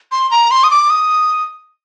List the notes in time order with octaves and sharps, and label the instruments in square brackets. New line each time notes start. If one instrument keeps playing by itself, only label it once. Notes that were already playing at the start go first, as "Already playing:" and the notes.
[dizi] C6
A#5
C6
D#6
D6
D#6